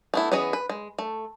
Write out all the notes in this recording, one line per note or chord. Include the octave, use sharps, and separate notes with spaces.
A3 B3 E4
E3 B3 C#4 G#4 D#5
B4
G#3
A3